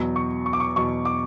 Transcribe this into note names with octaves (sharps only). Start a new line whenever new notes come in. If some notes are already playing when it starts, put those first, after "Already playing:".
Already playing: E2 B2 F#3
C#6
C#6
D6
C#6
E2 B2 F#3 C#6
D6